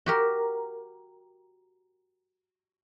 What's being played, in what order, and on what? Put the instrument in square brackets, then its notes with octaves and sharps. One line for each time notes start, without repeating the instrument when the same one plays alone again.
[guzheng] F#4 G4 A#4